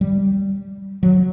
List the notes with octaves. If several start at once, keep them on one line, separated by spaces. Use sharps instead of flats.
G3
F#3